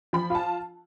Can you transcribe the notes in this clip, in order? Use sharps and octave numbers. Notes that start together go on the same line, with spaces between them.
F3 B5
F4 A5